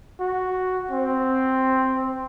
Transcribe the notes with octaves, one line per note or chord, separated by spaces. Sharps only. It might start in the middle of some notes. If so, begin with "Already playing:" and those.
F#4
C4